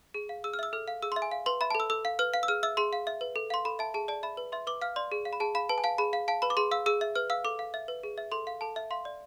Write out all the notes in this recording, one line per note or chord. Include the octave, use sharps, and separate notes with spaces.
G#4
F5
G#4 E6
F6
E5 E6
A4 F6
F5
G#4 E6
C6
E5
G#5
F5
B4 C6
E5 B5
A5
A4
E6
A4 E6
F5
B4 F6
F5
E6
G#4 F6
E5 E6
G#4 C6
F5
E5
B4
A4
F5 C6
A4 B5
E5 A5
G#4 A5
D5 A5
E5 B5
B4
E5 C6
B4 D6
F5 F6
D5 C6
G#4
F5
B5
G#4 A5
F5 B5
B4 A5
G#5
F5 A5
G#4 B5
F5
F5 A5
B4 B5
D6
G#4 C6
F5 E6
G#4 E6
E5
B4 F6
F5 E6
A4 D6
F5
E5
B4
G#4
E5
A4 C6
F5
A4 A5
E5
F5 C6
D5